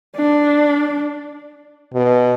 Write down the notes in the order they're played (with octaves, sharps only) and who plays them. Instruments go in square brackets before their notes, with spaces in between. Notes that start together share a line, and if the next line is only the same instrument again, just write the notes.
[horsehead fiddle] D4
[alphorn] B2